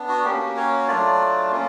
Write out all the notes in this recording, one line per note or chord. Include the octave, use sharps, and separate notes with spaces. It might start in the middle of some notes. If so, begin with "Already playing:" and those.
Already playing: B3 D4
F#4
A#3 C#4 F#4 G4
C#5
F#3 A3 D4 F4 D5
A#3 C#4 F4